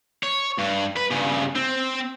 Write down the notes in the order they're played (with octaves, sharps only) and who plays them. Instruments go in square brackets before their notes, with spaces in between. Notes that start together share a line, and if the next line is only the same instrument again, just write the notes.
[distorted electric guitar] C#5
G2
B4
G2 C#3
C4